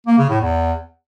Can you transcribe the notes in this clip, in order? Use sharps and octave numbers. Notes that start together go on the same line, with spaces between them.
A#3
C#3
A2
E2